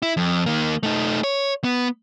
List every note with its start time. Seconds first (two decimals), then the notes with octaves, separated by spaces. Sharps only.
0.02 E4
0.17 F2
0.46 D#3 A#3
0.83 A3 D#4
1.24 C#5
1.64 B3